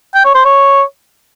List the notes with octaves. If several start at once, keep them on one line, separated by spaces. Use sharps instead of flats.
G5
C#5
C5
C#5